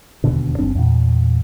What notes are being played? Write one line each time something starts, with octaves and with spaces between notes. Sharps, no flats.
E1 D#2 B2 D3
G1 G2 C4 D4
E2 A#2